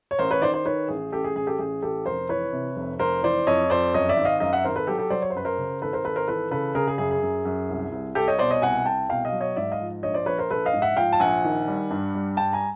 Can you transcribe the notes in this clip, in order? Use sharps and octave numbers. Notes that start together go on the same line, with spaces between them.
C#5
A1 A#4 C5
B4 C#5
D#3 C5 D5
C5 D5
D#3 B4 C#5
A1 G#4
A1 G4 A4
G#4
A1 G#4
G4 A4
A1 G#4
A1 G4 A4
F1 A#4 C5
E3 B4 C#5
C3
F1
F1 A#4 C5
E3 C5 D5
F2 C#5 D#5
F2 C5 D5
F#2 C#5 D#5
D5 E5
G#1
D#5 F5
F#2 D#5 F5
E5 F#5
G#1 A#4 C5
A4 B4
F#3 G4 A4
G4 A4
F#3 C5 D5
C#5
C5
F#2 B4
A#4 C5
C#3
G#1 A4 B4
A#4 C5
G#1 A4 B4
A#4 C5
E3 A4 B4
C#3 A4 B4
C#3 G#4 A#4
G#4
F#2 G#4
G#4
F#2
F#2
C2
C2
C2 G4 A4
C#5 D#5
B2 C5 D5
C#5 D#5
C2 F#5 G#5
C2 G5 A5
B2 F5 G5
D#5 F5
F#3
C#5 D#5
G#2 D5 E5
D#5 F5
F3
A#1 C#5 D#5
C5 D5
A#1 B4 C#5
A#4 C5
A#1 A4 B4
D#5 F5
G#2
E5 F#5
F3 F5 G5
A5
A#1 F#5 G#5
D#3
G3
G2
G3
G2 G5 A5
G#5 A#5